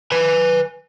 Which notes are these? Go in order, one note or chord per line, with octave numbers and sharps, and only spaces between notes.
B4 G#5